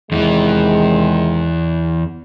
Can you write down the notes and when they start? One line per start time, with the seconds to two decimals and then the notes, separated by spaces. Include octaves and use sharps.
0.12 E2 C3 D#3 E3 G#3